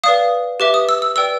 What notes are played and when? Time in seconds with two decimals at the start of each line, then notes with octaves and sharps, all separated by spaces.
0.04 B4 D5 F5 D#6
0.60 G4 B4 E5 D6
0.74 D#6
0.89 E6
1.02 E6
1.16 B4 D5 G5 E6